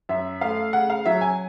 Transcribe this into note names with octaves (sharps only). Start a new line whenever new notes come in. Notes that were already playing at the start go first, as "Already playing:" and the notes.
F#2 E5
A3 F5
C#3 F#5
F5
F#3 E5
G#5